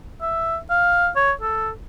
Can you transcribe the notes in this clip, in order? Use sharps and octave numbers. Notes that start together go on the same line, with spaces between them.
E5
F5
C#5
A4